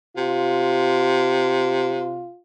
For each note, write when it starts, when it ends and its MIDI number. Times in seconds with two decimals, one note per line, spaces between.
0.17 2.30 48
0.17 2.40 65